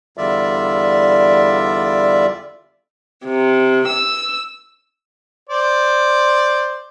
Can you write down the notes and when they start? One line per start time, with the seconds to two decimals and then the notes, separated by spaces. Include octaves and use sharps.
0.17 E2 D3 G3 F4 D5 E5
3.24 C3
3.88 E6
5.49 C5 D5